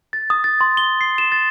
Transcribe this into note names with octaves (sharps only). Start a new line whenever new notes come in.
A6
D#6
A6
C6
G7
C7
E7
A6